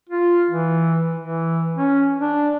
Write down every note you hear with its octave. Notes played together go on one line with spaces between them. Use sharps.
F4
E3
E3
C#4
D4